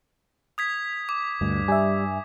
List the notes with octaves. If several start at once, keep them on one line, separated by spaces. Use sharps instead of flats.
D#6 G#6 B6
D6
D2 G2
G3 E5 G#5